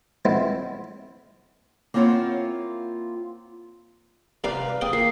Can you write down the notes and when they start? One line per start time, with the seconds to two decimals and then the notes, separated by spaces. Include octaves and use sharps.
0.25 F3 F#3 G#3 B3 C4 E4
1.94 A#3 C4 E4 F4 C#5 F#5
4.44 G#2 C3 B4 D5 F5 A#5
4.81 C4 F4 G#4 C5
4.93 A#3 C7